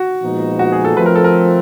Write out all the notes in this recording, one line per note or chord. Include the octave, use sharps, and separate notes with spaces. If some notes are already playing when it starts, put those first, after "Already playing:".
Already playing: F#4
A#2 F3 G#3 B3 D#4
F#4
G#4
A4
F3 A3 C4 B4
A#4
A4
A#4